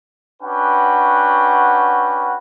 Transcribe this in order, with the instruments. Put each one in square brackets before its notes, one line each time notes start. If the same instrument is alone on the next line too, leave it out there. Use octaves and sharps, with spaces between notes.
[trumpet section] C#4 D4 F#4 B4 F#5 G5